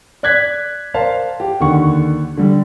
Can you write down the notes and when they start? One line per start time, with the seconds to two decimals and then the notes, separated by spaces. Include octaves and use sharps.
0.23 D5 F#6 G#6 B6
0.94 A#4 C5 D5 F5 A5
1.40 G4
1.60 D#2 D3 F#5 C#6
2.37 D3 G3